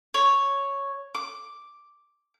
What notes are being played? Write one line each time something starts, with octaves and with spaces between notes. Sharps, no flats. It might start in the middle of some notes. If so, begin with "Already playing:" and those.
C#5
D6